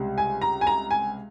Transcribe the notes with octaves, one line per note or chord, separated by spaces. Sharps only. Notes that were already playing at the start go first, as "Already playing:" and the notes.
Already playing: C#2 C3 G3
G#5
A#5
G#5
A#5
G#5